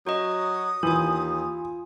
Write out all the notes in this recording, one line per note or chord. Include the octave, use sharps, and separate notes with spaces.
F#3 F#4 D#5 D#6
D#2 E3 F4 G#5